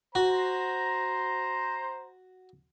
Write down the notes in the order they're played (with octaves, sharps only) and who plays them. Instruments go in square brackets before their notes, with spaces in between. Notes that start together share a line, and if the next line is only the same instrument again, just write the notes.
[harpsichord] F#4 [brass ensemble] C5 A#5